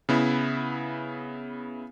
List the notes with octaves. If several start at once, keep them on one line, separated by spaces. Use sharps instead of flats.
C#3 B3 E4